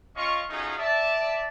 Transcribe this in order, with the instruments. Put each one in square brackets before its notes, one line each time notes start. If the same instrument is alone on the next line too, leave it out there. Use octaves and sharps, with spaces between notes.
[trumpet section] C#4 F4 D#5 F5 C#6
A3 C#4 D#4 F4 F#4 G#4
D5 E5 A5